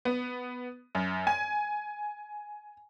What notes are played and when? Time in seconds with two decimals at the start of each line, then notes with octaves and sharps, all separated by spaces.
0.05 B3
0.95 F#2
1.27 G#5